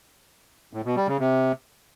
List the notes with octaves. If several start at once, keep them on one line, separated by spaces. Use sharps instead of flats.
A2
B2
G3
C#3
C3